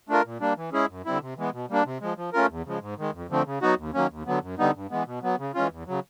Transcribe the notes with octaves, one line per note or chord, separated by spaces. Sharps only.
A3 D4 F4 A#4
A#2
G3 A#3 D4
E3
G#3 C#4 E4 G#4
F#2
D3 G3 C4 E4
C3
E3 G#3 B3
B2
G3 A#3 D4
C3
F3 G#3
F3
A3 C#4 F4 A#4
E2
C#3 F3 G#3
G#2
D#3 G#3
F2
D3 F3 A3 C4
C#3
F#3 B3 D#4 F#4
D#2
D#3 F#3 A#3 C#4
D#2
D3 F#3 B3
F#2
D3 G3 B3 D#4
G2
E3 G#3 B3
B2
F#3 B3
C#3
E3 G#3 C#4 F4
E2
C#3 F#3